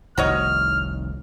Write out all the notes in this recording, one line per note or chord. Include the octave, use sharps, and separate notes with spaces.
F1 C2 D#3 F#4 C#5 D#5 F6